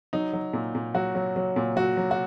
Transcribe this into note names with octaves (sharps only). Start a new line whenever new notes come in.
F#3 D#4
F#3
A#2
A#2
F#3 F#4
F#3
F#3
A#2
F#3 F#4
F#3
F#4